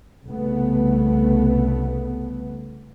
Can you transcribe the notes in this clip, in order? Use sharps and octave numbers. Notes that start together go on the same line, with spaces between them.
C2 C#3 A3 B3